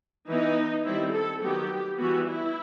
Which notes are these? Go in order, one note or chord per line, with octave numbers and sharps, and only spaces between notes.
E3 B3 D#4
D#3 G3 C4 E4
A4
D#3 F#3 B3 G4
E3 G3 B3 F#4
E4